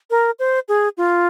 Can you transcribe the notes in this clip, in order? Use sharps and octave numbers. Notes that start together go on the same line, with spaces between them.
A#4
C5
G#4
F4